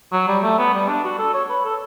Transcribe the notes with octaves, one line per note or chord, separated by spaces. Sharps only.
F#3
G3
A3
B3
G3
D4
F#4
A4
C#5
B4
A4